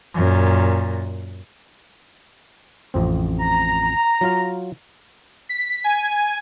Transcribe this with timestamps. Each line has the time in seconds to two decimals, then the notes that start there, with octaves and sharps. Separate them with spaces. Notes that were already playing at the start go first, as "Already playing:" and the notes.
0.14 F#2 A#2
2.94 A1 F2 C4
3.40 A#5
4.21 F#3 F4 F5
5.49 B6
5.84 G#5